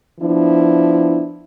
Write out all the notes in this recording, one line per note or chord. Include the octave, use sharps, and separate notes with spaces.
F3 B3 D4 E4